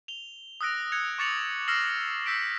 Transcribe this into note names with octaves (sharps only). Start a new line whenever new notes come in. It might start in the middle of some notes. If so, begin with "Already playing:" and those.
F7 G7
D#6 E6 F#6 A#6 D7
F#6 G#6 C#7 F7
C#6 D6 A6 C#7 F7 F#7
E6 F6 A#6 C7 E7 F#7
E6 G6 B6 C7 D7